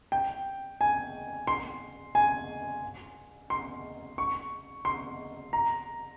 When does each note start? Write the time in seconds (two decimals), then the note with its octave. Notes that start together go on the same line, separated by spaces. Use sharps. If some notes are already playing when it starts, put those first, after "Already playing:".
0.12 G5
0.81 G#5
1.47 C6
2.15 G#5
3.50 C6
4.18 C#6
4.85 C6
5.53 A#5